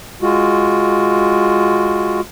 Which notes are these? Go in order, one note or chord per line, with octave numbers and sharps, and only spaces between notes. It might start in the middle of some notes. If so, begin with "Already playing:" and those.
G#3 F4 F#4